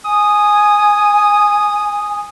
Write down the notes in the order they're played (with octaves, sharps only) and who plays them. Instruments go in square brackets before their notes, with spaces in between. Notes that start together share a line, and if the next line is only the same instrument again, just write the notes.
[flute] G#5 [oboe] D#6